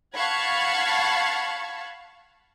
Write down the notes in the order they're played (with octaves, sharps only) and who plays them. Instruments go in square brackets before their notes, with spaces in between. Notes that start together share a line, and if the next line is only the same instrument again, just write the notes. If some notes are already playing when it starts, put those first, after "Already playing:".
[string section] F5 F#5 A5 B5 C#6 G#6